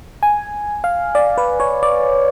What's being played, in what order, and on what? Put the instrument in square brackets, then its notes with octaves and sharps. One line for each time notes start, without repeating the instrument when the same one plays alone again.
[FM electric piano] G#5
F5
D5
B4
C#5
D5